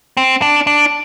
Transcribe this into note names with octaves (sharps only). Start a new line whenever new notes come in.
C4
D4
D4